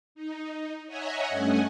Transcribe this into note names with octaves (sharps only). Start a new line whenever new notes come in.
D#4
C#5 D#5 E5 F#5 G#5 A#5
G2 A3 C#4 D#5 F#5 G#5